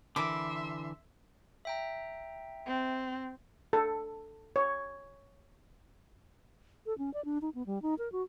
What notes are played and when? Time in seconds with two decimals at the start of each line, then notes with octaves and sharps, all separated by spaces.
0.16 D3 E3 A#4 E5 B5 C6 D6
1.65 E5 G5 A#5
2.67 C4
3.73 A4
4.56 C#5
6.86 A4
6.98 C#4
7.14 D5
7.25 D4
7.42 D#4
7.55 B3
7.66 G3
7.82 D#4
7.99 A#4
8.12 F#4